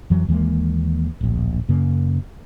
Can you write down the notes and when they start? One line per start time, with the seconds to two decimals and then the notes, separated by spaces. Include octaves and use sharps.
0.10 F2 E3 F#3
0.28 D#2 E3 G#3 A#3
1.21 D1 A#1
1.68 F#2 C#3 A#3